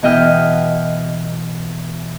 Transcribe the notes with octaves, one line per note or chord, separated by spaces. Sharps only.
B2 E3 D#5 G5 F6